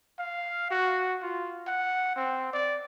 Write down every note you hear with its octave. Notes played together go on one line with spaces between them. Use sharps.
F5
F#4
F4
F#5
C4
D5